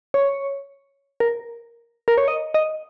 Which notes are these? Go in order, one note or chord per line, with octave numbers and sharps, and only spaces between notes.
C#5
A#4
A#4
C#5
D#5
D#5